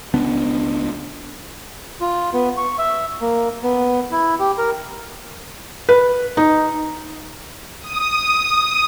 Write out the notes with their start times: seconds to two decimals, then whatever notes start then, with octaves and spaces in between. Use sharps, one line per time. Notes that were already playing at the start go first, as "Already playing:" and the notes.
0.14 C#2 B3 D4
2.01 F4
2.33 B3
2.57 C#6
2.78 E5
3.21 A#3
3.63 B3
4.11 E4
4.39 G4
4.58 A#4
5.89 B4
6.37 D#4
7.80 D#6